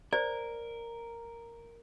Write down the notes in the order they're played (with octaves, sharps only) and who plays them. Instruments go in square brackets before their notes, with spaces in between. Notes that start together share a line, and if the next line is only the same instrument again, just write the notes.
[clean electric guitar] A#4 [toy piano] C5 D5